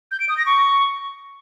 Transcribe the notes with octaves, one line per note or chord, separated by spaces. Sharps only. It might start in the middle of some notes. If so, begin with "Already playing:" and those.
G6
D7
D#6
A#6
C#6